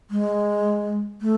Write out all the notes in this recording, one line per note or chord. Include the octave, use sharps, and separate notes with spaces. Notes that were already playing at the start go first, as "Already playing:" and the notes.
G#3
A3